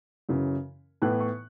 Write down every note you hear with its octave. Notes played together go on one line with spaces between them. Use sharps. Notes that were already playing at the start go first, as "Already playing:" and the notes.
F#2 C#3 E3
A2 E3 B3 F#6
C#6